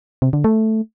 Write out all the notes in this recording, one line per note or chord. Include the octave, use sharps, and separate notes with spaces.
C3
D3
A3